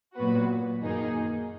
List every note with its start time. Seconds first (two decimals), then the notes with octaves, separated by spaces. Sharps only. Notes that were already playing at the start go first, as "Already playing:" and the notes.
0.15 A#2 F#3 B3 F#4 B4
0.81 F#2 D#3 A#3 D#4 G#4